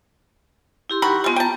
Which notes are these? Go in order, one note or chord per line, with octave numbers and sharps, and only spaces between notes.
E4 G4 C6
D#3 F#4 B5
G3 G#3 B3 F4
G5 A5 A#5